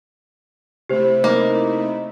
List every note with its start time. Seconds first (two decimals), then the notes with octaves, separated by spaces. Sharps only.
0.89 C3 A3 E4 G4 C5
1.24 A#3 D#4